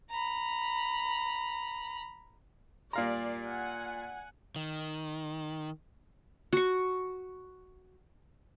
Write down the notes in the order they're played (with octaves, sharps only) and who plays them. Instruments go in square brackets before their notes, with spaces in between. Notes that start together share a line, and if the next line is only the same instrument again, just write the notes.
[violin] A#5 B5
[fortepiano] A#2 F5 A#5 [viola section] G3 A#4 D5
[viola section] F#5 G#5
[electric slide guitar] D#3
[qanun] F#4 C#6